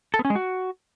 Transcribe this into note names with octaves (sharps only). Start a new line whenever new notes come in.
A4
B3
C#4
G#3
F#4